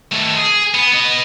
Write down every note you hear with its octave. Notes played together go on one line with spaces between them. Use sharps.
D#3 A3
G#4
B3
B3 D#5